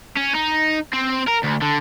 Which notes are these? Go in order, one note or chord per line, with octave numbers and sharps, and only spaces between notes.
C#4
D#4
C4
A#4
D2
D3